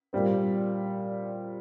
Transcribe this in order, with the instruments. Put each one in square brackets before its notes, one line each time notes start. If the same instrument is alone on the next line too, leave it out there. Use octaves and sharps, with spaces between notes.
[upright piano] A#2 G3 C4